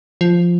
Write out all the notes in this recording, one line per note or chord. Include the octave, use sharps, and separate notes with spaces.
F3